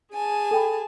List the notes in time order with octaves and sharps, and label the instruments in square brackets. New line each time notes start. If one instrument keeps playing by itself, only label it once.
[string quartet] G#4 G#5 A5
[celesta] A4 G5 B5